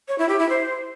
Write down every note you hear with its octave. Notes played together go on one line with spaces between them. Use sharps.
C#5
E4
G4
E4
C5